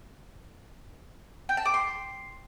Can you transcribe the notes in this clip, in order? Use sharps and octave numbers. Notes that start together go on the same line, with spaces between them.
G5
A5
D6
C6